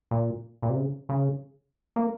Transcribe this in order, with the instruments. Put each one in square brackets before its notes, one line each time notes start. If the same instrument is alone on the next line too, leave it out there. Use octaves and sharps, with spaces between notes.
[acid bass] A#2
A#2
C3
C#3
C#3
A#3